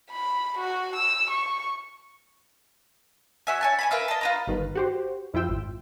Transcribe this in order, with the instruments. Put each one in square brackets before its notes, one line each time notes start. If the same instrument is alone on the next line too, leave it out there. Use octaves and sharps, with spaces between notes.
[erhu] B5
F#4
E6
C#6
[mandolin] F#4 E5 G#5
C#5 G#5 A5
G#5 A5 B5
A#4 B4 E5 F5
D#5 A5
F4 B4 A#5
[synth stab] G1 D#3 B4
F#4 G4 C5
F2 E4 F4 G5 E6
G#1